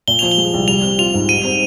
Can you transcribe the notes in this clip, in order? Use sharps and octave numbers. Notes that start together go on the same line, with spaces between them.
A#2 G7
F3 F7
G7
G#3
C2
G3 F7
C4
F4 F7
G#2
G3 D#7
C4